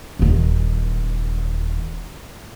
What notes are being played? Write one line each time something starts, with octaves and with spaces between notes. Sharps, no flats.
D#1 D#3